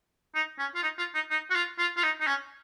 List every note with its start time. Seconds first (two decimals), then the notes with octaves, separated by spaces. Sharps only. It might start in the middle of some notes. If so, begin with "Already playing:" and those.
0.35 D#4
0.59 C#4
0.75 F4
0.83 D#4
0.98 F4
1.14 D#4
1.30 D#4
1.50 F#4
1.55 F4
1.79 F4
1.97 F4
2.03 D#4
2.20 D#4
2.27 C#4